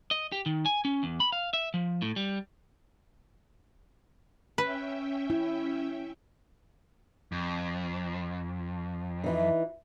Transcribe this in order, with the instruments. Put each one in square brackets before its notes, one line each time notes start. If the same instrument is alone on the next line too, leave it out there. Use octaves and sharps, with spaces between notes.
[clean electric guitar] D#5
G4
D#3
G#5
C#4
E2
B5
F5
E5
F3
A2
G3
[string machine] C#4 E5 G5 [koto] B4
[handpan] E4
[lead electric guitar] F2
[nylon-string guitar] E3 D#4